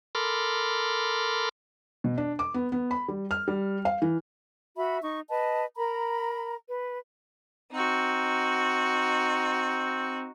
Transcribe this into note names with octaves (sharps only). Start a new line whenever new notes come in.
A4 A#4 B5 C6 D6 F6
B2
D4
D6
B3
B3
B5
G3
F6
G3
F5
E3
F#4 E5 B5
D#4 C#6
B4 D#5 A5
A#4 A#5 B5
B4
C4 D#4 F#4